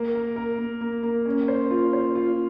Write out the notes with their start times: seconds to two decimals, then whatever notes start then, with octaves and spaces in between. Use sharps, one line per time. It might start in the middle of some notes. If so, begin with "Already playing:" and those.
Already playing: A#3
0.15 A#4
0.36 A#4
0.59 A#3
0.81 A#3
1.03 A#3
1.25 C#4
1.48 C5
1.71 F4
1.93 C5
2.15 F4